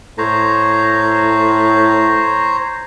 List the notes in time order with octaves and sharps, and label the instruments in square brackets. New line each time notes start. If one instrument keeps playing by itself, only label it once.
[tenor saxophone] A2 [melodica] C5 C#5 A#5